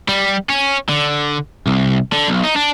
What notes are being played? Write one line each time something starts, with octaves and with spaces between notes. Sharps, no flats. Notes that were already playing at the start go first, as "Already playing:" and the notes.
G3
C#4
D3
C2
D3
B1
D#4
D4